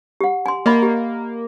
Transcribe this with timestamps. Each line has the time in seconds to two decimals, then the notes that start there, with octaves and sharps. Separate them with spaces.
0.21 G4 F#5
0.46 G#5 C6
0.66 A#3 D5 D#5 B5
0.83 G4